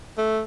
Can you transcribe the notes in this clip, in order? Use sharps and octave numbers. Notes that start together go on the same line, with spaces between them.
A3